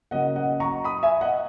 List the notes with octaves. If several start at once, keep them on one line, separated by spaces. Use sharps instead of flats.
C#3 F#3 A#3 D#5 F#5
D#5 F#5
A#5 C#6
B5 D#6
E5 G#5
D#5 F#5